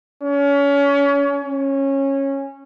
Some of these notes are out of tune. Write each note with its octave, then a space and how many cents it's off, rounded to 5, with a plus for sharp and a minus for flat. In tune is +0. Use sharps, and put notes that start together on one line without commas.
C#4 +30
C#4 -15